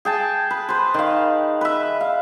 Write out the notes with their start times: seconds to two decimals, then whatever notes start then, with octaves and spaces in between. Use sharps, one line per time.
0.05 G#4 G5 A5
0.51 B4
0.69 B4 C5
0.94 D#3 F5
1.61 B4 E5
2.01 F5